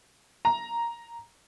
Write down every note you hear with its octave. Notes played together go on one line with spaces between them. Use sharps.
A#5